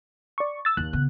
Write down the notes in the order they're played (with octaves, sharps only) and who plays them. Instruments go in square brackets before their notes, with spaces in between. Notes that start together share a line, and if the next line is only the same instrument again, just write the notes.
[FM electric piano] D5 C#6
E6 A6
[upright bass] D#2 [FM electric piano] F#6
[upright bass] C#3 B3